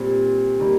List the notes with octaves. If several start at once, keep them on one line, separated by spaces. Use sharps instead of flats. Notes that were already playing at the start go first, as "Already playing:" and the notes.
Already playing: A#2 G3 C4
D#3 G3 A#3